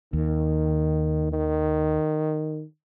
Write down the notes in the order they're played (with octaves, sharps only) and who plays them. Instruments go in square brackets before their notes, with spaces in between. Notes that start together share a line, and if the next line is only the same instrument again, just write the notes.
[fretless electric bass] D#2 [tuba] D#3
[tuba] D#3